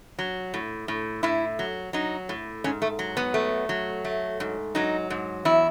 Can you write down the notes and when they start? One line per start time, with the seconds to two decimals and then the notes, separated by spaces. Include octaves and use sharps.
0.19 F#3
0.54 A2
0.88 A2
1.23 A2 E4
1.59 F#3
1.93 F#3 D#4
2.29 A2
2.64 G#2 C#4
2.82 A3
2.99 F#3
3.17 B3
3.34 A3
3.69 F#3
4.04 A3
4.40 G#2
4.75 F#3 D#4
5.10 G#2
5.45 E2 E4